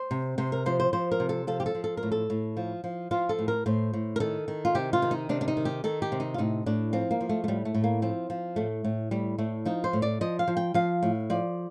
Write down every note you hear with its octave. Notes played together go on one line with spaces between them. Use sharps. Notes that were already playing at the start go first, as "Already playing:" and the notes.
Already playing: C5
C3
C3 C5
A#4
F3 C5
C5
F3 C5
A#4
C3
A4
F3 A4
G4
A4
F3
A4
A#4
A2
A4
A2
F3
F3
F3 F4
A4
A2
A#4
A2 C5
A2
A#4
D#3 A4
D#3
F4
C3 G4
F4
D#3
D#4
C3 D4
D4
D#4
D#3
G4
D#3 A4
G4
C3
D#4
F4
A2 D#4
A2 D4
F3 C4
A#3
F3
A3
A3
A2 G3
A3
A2
A#3
F3 C4
F3
A2 A3
A2
A2 G3
A2 A3
F3 D#4
C5
A2
D5
F3 D#5
F5
F3
G5
F3 F5
A2
F3 D5